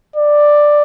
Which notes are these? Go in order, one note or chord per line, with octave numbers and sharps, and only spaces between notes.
D5